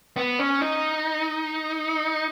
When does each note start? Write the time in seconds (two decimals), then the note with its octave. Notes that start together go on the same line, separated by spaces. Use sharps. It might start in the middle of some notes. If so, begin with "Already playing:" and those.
0.16 B3
0.39 C#4
0.61 D#4